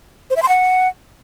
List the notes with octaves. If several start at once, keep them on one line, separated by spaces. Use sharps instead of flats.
C5
E5
C6
F#5